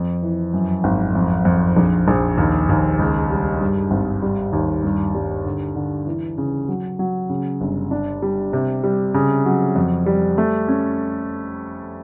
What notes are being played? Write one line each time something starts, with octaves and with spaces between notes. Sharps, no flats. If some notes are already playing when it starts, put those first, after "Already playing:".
Already playing: F2
E3
F#2
G#1
F2
F2
A#1
A#1
D#2
D#2
C#2
G3
G2
G#1
G3
D#2
G2
G3
D3
D3
E3
C#3
F#3
F#3
C#3
G1
D4
G3
C3
G3
C#3
F#3
F2
G3
A3
C#4